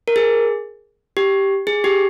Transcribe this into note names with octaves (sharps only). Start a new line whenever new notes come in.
A#4
G#4
G4
G#4
G4